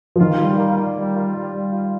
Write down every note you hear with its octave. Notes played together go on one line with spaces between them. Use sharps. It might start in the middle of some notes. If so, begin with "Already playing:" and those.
F3
D#3 F4
G3
A#3
A#3
G3
F4
G3
G3
F4